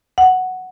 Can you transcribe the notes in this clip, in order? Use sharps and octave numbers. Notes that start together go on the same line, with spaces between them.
F#5